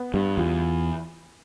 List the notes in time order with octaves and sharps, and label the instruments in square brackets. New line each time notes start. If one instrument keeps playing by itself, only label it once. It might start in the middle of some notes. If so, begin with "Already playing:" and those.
Already playing: [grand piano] B3
[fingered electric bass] G2 [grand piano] G3
[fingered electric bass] E2 [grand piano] F4